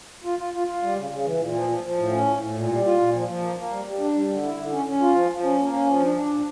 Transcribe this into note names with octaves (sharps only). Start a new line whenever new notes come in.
F4
F4
F4
F4
G3
C#3
C#3
E3
A#2
F3
F3
F3
A2
C#4
A2
A2
A#2
G3
F4
A#2
F3
F3
A#3
A#3
G3
G3
D4
G3
D3
E4
D3
C#4
C#4
F4
F3
F3
C#4
A#3
C#4
F3
D4
D4
A#2